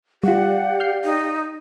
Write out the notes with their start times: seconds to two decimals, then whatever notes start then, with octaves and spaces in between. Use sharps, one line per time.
0.23 G3 F4 G4 D5 F5 F#5
0.80 F6 G6 C7
1.05 D#4